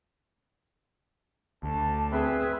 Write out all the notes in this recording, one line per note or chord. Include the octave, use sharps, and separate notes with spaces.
D2 A5
C4 G#4 B4 E5